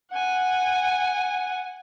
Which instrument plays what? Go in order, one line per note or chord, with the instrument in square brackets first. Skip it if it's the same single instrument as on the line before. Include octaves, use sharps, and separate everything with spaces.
[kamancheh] F#5 G#5